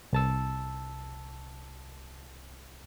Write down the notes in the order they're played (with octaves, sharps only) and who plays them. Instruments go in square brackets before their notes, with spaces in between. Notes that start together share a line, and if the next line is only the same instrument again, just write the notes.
[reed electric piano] C2 A5 E6